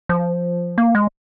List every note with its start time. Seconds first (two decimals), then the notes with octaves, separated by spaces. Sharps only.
0.09 F3
0.78 A#3
0.95 G#3